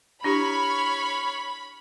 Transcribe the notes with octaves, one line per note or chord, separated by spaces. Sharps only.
D4 E4 G4 C#5 B5 C#6 F6